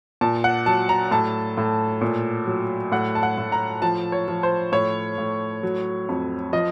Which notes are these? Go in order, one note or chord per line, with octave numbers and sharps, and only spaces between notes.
A#2 A5
F#5
F#3 A5
A#5
A2 A5
A2
A#2
F#3
A2 F#5
A5
F#5
A2
A#5
F3 A5
C#5
F3
C5
A2 C#5
A2
F#3
F2
F3 D#5